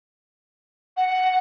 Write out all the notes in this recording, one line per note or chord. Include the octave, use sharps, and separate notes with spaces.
F#5